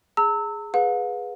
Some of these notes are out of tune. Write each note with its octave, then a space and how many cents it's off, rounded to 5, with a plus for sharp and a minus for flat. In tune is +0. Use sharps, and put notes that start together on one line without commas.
G#4 +0 A#5 -45 E6 -20
G#4 +0 B4 +0 F5 +45